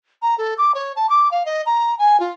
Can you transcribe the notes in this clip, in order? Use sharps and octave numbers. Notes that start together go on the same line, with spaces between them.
A#5
A4
D6
C#5
A5
D6
F5
D#5
A#5
G#5
F4